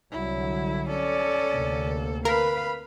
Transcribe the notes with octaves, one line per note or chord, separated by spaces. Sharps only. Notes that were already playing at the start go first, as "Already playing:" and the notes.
C2 D3 F#3 E4
C#4 A4 D5
D2 C3 A#3
A#4 B4 F5 B5